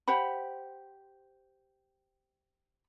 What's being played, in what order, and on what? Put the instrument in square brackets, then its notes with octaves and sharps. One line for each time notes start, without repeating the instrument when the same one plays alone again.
[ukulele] G4 C5 F#5 B5